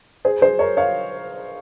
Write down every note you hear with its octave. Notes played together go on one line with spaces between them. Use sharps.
G#4 C5
G#4 C5
A#4 C#5
C#5 F5